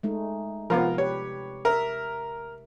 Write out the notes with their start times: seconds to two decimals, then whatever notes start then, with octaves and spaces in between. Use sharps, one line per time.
0.03 G#3 A3 D#4
0.70 C3 F3 B3 F4 A#4
0.98 G4 B4 C#5
1.65 A#4 E5